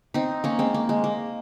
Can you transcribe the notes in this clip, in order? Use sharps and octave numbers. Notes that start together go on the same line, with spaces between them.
C4 D#4
A#3 C#4
G#3 C4
A#3
G#3
A#3